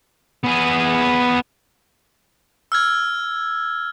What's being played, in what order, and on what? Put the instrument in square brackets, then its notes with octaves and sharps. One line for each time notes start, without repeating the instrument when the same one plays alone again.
[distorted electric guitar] B3 G#4
[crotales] E6 F6 G#6